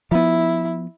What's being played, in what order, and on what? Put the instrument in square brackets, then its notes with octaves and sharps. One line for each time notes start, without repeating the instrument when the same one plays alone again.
[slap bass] F3 B3 [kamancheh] E4